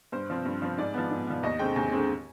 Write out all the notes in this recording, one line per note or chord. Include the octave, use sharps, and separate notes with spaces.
G2 C5
F3 C4
G2
F3 C4
G#2 D5
F3 B3
G#2
F3 B3
D#2 D#5
D3 G#3 C4 G5
D#2 G#5
D3 G#3 C4